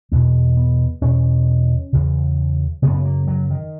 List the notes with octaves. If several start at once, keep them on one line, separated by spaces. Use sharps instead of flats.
E2 B2 A#3
B3
E2 B2 C#4
E2 C#3
F#2 C#3 B3
B3
A#3
F#3
D#3